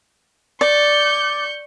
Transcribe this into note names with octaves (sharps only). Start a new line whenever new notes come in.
D5 C#6 G6